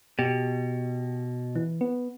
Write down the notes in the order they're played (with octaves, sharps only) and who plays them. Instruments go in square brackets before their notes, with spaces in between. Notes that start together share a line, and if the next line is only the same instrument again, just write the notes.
[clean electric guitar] B2 [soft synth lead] G4
[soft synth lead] E3
B3